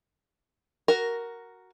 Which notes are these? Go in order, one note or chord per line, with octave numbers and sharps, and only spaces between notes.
F#4 A#4